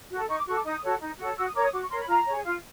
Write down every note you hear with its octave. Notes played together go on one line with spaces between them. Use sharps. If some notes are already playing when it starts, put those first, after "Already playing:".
F#4 A4
D#4 C#6
D6
F#4 A4 C#6
D6
D#4 D#6
F#4 A4 C#5
D#4
F#4 A4 C#5
F#4 E6
D#6
A#4 C#5 D6
D#6
F#4 D6
C#6
A#4 C#5 C6
B5
F4 A#5
G#4 C#5
F4